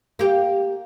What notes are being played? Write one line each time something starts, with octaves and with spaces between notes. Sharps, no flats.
A#3 G4